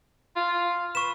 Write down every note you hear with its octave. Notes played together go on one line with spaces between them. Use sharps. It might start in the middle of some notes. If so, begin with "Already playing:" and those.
F4
B4 C#6 E7